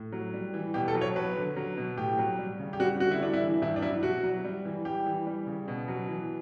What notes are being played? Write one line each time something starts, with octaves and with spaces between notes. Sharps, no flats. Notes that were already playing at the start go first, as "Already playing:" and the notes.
Already playing: A2
F#3
G3
E3
B2 G4
A4
F#3
C#5
F#3 B4
D3
F#3
B2
A2 G4
F#3
G3
C#3
G4
G3 F#4
D3 F#4
E4
G3 D4
E4
E3
G2 E4
D4
F#3 E4
B2 F#4
F#3
G3
E3
G3 G4
E3
G3
C#3
B2
F#3
E3